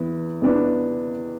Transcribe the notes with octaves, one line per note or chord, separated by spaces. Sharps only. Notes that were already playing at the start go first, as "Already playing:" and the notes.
Already playing: E2 E3 B3
E2 E3 B3 D4 B4